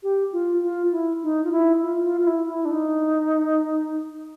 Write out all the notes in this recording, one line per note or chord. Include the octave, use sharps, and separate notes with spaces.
G4
F4
F4
E4
D#4
F4
E4
F4
F4
F4
E4
E4
D4
D#4